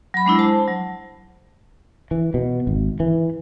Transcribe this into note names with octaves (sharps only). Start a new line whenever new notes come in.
F#3 B5
G#3 D4 E4
C5 A5
F#3
E3
B2
G#1
E3